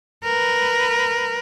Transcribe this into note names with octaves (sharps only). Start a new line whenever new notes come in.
A#4 B4